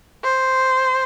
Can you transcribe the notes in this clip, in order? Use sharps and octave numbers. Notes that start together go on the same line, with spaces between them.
C5